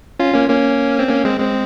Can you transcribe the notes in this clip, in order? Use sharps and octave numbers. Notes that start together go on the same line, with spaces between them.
C#4 F4
A#3 C#4
A#3 C#4
C4
A#3 C#4
G#3 C4
G#3 C4